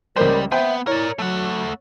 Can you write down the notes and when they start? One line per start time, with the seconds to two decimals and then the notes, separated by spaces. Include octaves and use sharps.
0.16 C#2 G3 A#3 A#4 C5
0.52 B3 C5 E5 G5
0.87 E4 A#4 C#5 D5
1.19 F#3 A3 F#5